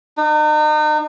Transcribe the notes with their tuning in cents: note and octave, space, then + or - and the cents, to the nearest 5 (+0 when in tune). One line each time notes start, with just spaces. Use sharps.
D#4 -40